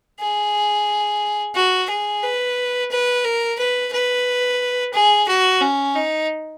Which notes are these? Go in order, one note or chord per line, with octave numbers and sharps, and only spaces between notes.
G#4
F#4
G#4
B4
B4
A#4
B4
B4
G#4
F#4
C#4
D#4